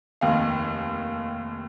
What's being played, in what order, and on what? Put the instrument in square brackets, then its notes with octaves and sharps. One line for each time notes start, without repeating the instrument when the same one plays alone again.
[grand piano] F1 D#2 D#3 F5